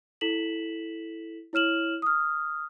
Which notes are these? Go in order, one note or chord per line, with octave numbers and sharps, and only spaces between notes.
E4 A4 B6 E7 F#7
E4 C#5 F6 E7 F#7
D#6 F6